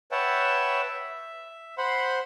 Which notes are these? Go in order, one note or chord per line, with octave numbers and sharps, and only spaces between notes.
B4 C#5 E5 F#5 G5 A5
E5
C5 F#5 B5 C6